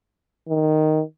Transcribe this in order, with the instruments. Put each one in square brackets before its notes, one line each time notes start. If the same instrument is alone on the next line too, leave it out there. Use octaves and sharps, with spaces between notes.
[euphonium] D#3